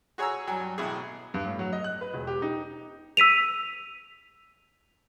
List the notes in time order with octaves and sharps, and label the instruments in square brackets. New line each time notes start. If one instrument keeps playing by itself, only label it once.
[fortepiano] F#4 G#4 C#5 G#5 A#5 E6
G2 F#3 G5 G#5
A1 B2 E4 G#4
[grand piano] G2
A2
F#3
D#5
F#6
B4
E1
G4
D#4
[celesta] E6 B6 D#7 F7